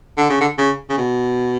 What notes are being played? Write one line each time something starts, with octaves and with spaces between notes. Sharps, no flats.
D3
C#3
D3
C#3
C#3
B2